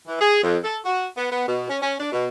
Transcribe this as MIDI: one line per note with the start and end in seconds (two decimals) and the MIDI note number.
0.07 0.20 52
0.21 0.42 68
0.44 0.57 41
0.64 0.79 69
0.85 1.07 66
1.17 1.28 59
1.32 1.44 59
1.47 1.66 47
1.70 1.80 61
1.82 1.96 61
2.00 2.12 62
2.12 2.27 47